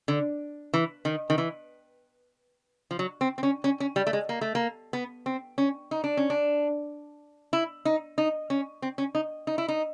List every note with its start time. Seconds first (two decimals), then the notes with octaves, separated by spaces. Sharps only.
0.08 D3
0.74 E3
1.05 D#3
1.30 D#3
1.38 E3
2.91 F3
2.99 F#3
3.21 C4
3.38 C4
3.43 C#4
3.64 C#4
3.80 C#4
3.96 G3
4.07 A3
4.13 G#3
4.29 A#3
4.41 A3
4.55 A#3
4.93 B3
5.26 C4
5.58 C#4
5.91 D#4
6.04 D4
6.17 C#4
6.30 D4
7.53 E4
7.85 D#4
8.18 D#4
8.50 C#4
8.82 C4
8.98 C#4
9.15 D#4
9.47 D#4
9.58 E4
9.68 D#4